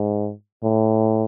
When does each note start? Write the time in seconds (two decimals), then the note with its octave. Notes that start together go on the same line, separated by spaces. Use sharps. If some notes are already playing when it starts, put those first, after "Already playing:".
Already playing: G#2
0.63 A2